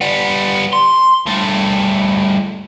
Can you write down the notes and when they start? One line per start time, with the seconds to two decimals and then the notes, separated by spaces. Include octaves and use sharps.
0.01 G3 B3
0.73 C6
1.26 G2 A3